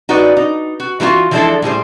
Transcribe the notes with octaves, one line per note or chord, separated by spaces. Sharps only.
D#4 F#4 B4 D5
D#4
F#4
E3 G#3 A#3 F4 F#4
E3 F3 G#3 D4 E4 A4
A2 G3 G#4 C5